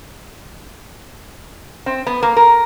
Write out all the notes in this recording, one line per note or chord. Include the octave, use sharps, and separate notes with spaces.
C4
B3
A#3
A#4